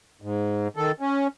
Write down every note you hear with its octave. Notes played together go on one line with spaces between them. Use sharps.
G#2
D#3 A4
C#4